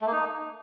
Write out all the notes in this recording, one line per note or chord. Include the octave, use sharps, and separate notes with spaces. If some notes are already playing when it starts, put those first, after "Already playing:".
A3
A#3
D#4